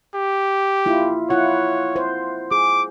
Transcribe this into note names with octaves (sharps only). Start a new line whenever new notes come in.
G4
A#3 E4 F4
E4 F4 C#5 F#5
C5
G#4 D6